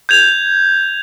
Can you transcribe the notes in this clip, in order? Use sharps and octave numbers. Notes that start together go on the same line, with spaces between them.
G6 G#6 F7